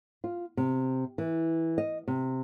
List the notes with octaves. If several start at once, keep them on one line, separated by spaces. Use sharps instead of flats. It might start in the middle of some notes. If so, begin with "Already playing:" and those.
F4
C3
E3
D#5
C3